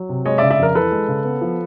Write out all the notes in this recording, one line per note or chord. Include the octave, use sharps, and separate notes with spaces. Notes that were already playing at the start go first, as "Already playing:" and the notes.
Already playing: F#3
C3
G#3 C#5 D#5
D5 E5
C#3
D5 E5
F2 A#4
E3 A4 B4
G#3
C#3
B3
F3